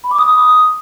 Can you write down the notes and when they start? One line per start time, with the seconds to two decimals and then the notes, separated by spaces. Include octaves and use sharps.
0.04 B5
0.11 D6
0.19 D#6